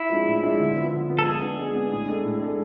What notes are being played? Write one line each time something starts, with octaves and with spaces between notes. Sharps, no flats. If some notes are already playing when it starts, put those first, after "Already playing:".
Already playing: E4
F3 G#3 D4
A2
F3 G#3 D4
D3
F3 B3
D3
F3 B3
A4
G#3 G#4
B3 D4
G#3
B3 D4
A2
G#3 D4 A4
A2
G#3 D4 A4